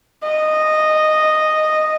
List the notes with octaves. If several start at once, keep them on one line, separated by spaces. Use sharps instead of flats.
D#5